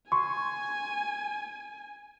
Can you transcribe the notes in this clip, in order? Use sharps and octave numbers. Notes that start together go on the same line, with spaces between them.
G#5 C6 C#6